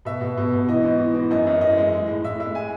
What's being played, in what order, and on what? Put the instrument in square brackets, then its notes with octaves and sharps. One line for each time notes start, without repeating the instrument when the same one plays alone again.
[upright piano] B2 E5
B2
B2
B2
E3 D#5
G#2
E3
E3
F#2 D#5
F#2
E3 D#5
G#3
G#3
A2
A2 E5
G#3 E5
G#5